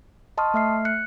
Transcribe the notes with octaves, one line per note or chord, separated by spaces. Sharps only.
D#5 A5 C6 C#6 D#6 F6
A3 E5 F6 C7
F#6 C#7